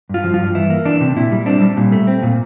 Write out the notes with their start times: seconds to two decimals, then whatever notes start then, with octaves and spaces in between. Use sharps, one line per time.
0.10 G2 F4
0.24 F3
0.34 F4
0.40 G2
0.55 E3 E4
0.70 A#3
0.85 E3 D4
1.01 C3
1.16 A#2 E4
1.32 G3
1.46 C4 D4
1.62 G3
1.77 A#2
1.92 A3
2.07 C4
2.23 A#2